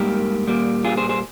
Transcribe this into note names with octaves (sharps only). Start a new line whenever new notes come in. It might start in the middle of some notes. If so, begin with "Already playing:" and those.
Already playing: G#2 G3 A#3 G4 A#4
A#2 G3 A#3
F4 G#4
G#4 C5
G#4 C5